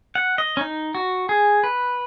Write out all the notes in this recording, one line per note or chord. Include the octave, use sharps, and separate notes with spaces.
F#5
D#5
C#4
D#4
F#4
G#4
B4